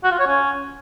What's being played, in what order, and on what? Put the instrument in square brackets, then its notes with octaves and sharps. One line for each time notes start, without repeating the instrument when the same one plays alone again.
[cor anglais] F#4
F4
C#5
C#4